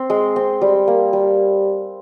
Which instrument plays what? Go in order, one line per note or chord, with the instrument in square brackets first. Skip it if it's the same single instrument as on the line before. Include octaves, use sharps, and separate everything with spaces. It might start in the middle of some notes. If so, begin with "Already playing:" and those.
Already playing: [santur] C4
G#3
C4
G3
A#3
G3